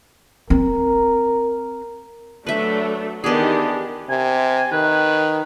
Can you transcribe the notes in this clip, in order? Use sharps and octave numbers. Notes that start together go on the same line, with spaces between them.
C4 A#4
F#3 A3 D4 B4 E5
D#3 E3 B3 D4 G4 G#4
C3 G#5
D#3 B4